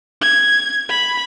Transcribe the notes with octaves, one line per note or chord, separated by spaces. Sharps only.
G#6
B5